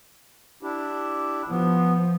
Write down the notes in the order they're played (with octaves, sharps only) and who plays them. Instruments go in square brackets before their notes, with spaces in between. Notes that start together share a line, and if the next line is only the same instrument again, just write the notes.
[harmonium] D4 E4 G4
[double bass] F3 [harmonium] B3